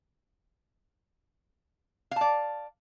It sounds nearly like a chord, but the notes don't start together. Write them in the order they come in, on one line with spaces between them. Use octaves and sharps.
F5 A5 D5